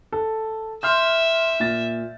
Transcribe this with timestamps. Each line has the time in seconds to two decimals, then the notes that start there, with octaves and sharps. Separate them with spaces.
0.12 A4
0.83 E5 C6 F6 G6
1.60 A#2 A6